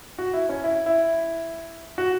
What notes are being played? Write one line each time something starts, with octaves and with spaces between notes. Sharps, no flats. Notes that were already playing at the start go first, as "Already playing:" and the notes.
F#4
E4
C#4
E4
E4
F#4